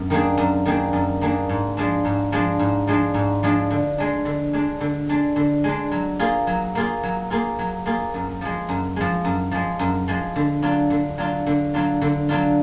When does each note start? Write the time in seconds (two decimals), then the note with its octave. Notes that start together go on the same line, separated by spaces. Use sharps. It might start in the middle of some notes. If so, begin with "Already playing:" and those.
Already playing: F#2
0.10 D#3 A#3 D4 G#4
0.37 F#2
0.66 D#3 A#3 D4 G#4
0.93 F#2
1.21 D#3 A#3 D4 G#4
1.49 G#2
1.77 F3 G#3 D4
2.05 G#2
2.32 F3 G#3 D4
2.59 G#2
2.87 F3 G#3 D4
3.14 G#2
3.43 F3 G#3 D4
3.70 D3
3.98 G#3 D4
4.25 D3
4.53 G#3 D4
4.81 D3
5.09 G#3 D4
5.36 D3
5.64 G#3 D4
5.91 F#3
6.19 A#3 F4 G#4
6.47 F#3
6.75 A#3 F4 G#4
7.03 F#3
7.30 A#3 F4 G#4
7.59 F#3
7.86 A#3 F4 G#4
8.14 F#2
8.41 F3 G#3
8.69 F#2
8.96 F3 G#3
9.25 F#2
9.51 F3 G#3
9.79 F#2
10.08 F3 G#3
10.36 D3
10.62 F#3 D4 F4
10.90 D3
11.18 F#3 D4 F4
11.47 D3
11.74 F#3 D4 F4
12.01 D3
12.29 F#3 D4 F4